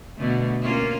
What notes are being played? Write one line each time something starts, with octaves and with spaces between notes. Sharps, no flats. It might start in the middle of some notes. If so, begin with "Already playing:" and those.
B2 D3 A3
A#3 C#4 F4